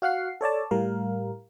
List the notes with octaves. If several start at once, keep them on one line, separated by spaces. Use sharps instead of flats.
F#4 F5 F#5 C7
A4 C#5 D5 A5
A2 G3 A#4 F5